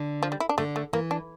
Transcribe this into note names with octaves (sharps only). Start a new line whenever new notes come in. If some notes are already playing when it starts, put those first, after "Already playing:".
Already playing: D3
F3
G3
E4
D4
D3 A3
A3
E3 A#3
D4